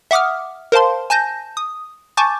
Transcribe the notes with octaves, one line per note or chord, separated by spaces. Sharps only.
E5 F#5 D6 D#6 F6
A#4 C5 F5 A5 C6
G#5 A5 G6 A#6
D#6
G#5 A5 C#6 D6 G6 A6